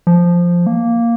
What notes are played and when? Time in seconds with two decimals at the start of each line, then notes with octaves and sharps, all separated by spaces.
0.07 F3
0.66 A#3